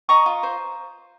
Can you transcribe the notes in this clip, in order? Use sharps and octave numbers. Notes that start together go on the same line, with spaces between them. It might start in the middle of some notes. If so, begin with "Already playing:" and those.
D#5 A#5 C#6
F4
C5